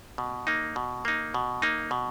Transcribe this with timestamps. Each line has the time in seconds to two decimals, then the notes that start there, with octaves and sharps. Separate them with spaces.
0.18 B2
0.47 A#3 D#4
0.76 B2
1.05 A#3 D#4
1.34 B2
1.62 A#3 D#4
1.91 B2